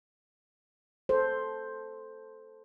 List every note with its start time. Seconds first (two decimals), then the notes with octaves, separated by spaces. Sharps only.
1.09 A4 C5